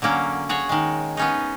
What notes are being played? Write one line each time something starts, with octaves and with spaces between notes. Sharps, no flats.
D3 F#3 A#3 C#4
F#4 G#4 C#5
D#3 G#3
B3 C#4 D#4